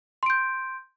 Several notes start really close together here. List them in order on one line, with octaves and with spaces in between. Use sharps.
C6 D7 G6